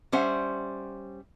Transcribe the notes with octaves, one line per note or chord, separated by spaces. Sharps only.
G3 C#4 C5 E5 F#5